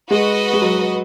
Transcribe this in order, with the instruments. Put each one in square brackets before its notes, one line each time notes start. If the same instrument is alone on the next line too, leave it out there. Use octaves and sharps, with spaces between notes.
[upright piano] G#3 [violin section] F#4 B4 D#5
[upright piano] G#3
F#3